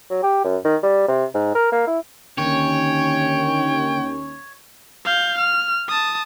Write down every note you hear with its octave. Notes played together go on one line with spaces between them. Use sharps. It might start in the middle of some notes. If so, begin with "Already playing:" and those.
F#3
G4
F#2
D#3
G3
C3
G#2
A#4
A#3
E4
D#2 D3 D#3 C#4 C#5 G5
F5 G6
F6
A5 D#6